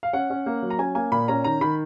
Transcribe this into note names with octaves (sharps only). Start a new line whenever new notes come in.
F5
C#4 F#5
C#4
A#3
F#3
A#5
C#4 G#5
A#3 G#5
A#2 B5
C#4 A#5
D#3 A#5
D#3 B5